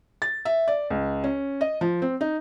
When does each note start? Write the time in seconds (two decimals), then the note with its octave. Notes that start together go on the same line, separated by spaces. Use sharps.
0.22 A6
0.45 E5
0.68 D5
0.90 C#2
1.24 C#4
1.61 D#5
1.81 F3
2.02 C4
2.21 D#4